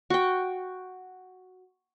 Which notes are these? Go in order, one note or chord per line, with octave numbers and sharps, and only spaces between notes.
F#4 G5